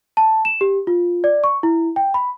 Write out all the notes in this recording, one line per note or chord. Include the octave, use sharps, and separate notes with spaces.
A5
E7
G4
F4
D5
C#6
E4
G5
B5